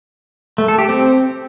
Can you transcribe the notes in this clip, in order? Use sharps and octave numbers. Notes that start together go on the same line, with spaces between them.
A3
A4
G4
C4